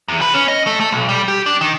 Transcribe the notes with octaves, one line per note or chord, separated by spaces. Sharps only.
E2
B4
C#4
D#5
A3
A3
B1
G3
G4
D4
D#3